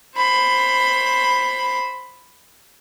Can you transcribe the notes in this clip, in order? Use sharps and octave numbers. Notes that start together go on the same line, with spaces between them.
C5 B5